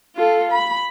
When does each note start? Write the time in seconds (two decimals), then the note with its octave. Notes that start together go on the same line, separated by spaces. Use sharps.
0.16 F4 A4
0.52 B5